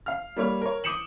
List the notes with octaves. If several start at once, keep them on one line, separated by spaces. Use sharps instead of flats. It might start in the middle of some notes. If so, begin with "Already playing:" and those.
F5 F6
G3 A#3 C#5 F6
A#4 C#5
D6 D#6 G6 C#7 E7 F#7